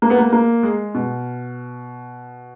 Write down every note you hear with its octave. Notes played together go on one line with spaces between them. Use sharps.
A#3
B3
A#3
A#3
G#3
B2